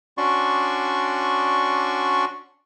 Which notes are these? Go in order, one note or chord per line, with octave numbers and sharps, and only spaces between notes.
C#4 D4 F#4 D5 C6 C#6